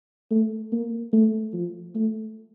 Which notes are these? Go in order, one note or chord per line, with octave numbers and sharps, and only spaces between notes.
A3
A#3
A3
F3
A3